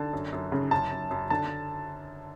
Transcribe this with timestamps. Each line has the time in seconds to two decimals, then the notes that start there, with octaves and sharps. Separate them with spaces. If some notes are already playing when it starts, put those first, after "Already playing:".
Already playing: D3 A5
0.13 F#2
0.33 F#2
0.52 C#3
0.71 F#2 A5
0.91 F#2
1.11 F#2
1.30 D3 A5